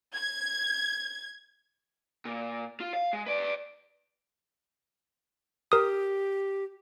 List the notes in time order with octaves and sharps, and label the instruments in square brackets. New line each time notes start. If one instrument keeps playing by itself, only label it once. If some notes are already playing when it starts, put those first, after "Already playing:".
[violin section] G#6
[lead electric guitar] A#2
F4
F5
G#3
B4 D5
[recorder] G4 [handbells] A#4 D#6